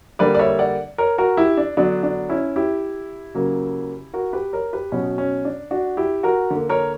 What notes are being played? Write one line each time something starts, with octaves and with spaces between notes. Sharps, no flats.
D3 G3 A#3 B4 D5
D5
C#5 E5
D5 F#5
A#4 C#5
F#4 A#4
E4 G4
D4
D3 F#3 B3 D4
D4
C#4 E4
E4 G4
C#3 F#3 A#3
F#4 A#4
G4 B4
A#4 C#5
G4 B4
B2 F#3 B3 C#4
C#4
D4
D4 F#4
E4 G4
F#4 A#4
D3 A#3
A#4 C#5